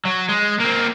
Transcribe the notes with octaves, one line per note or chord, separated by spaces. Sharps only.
F#3
G#3
A#3 C4